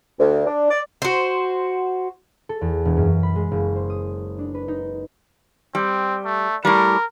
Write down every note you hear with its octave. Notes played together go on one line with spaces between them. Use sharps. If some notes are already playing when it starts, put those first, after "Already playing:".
D2
D4
D5
F#4 C5
A4
E2
E1
F#2
B5
G#3
F#1
C5
D#6
D4
B4
D#4
G3 C4
A3
A2 G3 A#4